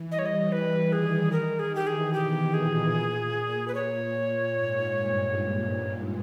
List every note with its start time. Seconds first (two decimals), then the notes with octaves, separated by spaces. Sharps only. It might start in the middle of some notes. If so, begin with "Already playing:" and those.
Already playing: E3
0.11 G3 D#5
0.19 C#5
0.26 D#5
0.52 E3 B4
0.92 D#3 G#4
1.32 D#3 A#4
1.59 G#4
1.73 E3 G4
1.87 G#4
2.13 B2 G4
2.54 A#2 G#4
3.68 B4
3.75 C#5
4.55 G#2
4.96 G2